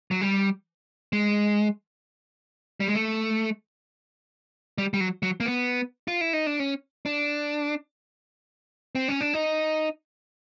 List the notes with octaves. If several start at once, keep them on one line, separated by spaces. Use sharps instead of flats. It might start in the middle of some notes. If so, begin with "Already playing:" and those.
F#3
G3
G#3
G3
G#3
A3
G3
G3
F#3
F#3
A#3
B3
F4
E4
D#4
D4
C#4
D4
C4
C#4
D4
D#4